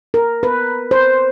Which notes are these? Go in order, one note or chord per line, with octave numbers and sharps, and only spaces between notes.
A#4
B4
C5